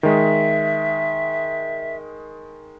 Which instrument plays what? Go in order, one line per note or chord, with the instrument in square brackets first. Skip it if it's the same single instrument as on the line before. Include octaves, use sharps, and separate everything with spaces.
[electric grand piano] D#3 G#3 [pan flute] E5